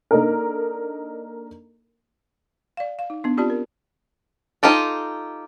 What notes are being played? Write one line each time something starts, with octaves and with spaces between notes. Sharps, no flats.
A#3 D4 D#4 A4 A#4
D5 F5
F5
D#4
B3 D4
C4 F4 G4 D5 A5
A#4
D#4 F4 G4 A4